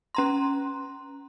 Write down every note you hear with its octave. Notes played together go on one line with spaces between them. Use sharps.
C#4 A#5 C6